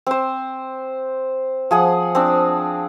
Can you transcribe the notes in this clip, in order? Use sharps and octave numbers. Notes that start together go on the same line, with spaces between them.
C4 C5
F3 G#4 F#5
C4 D4